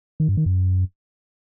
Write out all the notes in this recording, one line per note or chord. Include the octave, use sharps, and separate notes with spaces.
D#3
G2
D#3
F#2